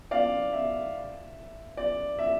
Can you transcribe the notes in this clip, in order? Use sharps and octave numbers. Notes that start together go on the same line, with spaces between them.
D5 F5
E5
D5
E5